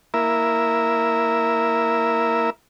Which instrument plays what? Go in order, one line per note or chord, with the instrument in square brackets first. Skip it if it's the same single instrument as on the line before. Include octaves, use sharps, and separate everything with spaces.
[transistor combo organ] A#3 E4 A#4 E5